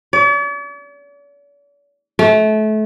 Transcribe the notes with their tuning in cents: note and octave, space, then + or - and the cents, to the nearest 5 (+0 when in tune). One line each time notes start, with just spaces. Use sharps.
D5 -45
A3 -30